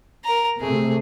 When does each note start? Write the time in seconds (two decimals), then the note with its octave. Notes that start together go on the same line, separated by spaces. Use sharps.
0.25 A#4 A#5
0.61 C3 A3 G#4